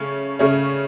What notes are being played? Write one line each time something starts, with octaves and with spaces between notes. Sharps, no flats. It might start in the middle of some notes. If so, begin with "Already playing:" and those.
Already playing: C#3 A3 C#4
C#3 A3 C#4